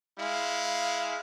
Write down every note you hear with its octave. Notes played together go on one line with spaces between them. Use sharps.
G#3 E4 F5